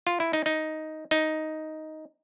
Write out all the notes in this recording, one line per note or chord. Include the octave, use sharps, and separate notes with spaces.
F4
E4
D#4
D#4
D#4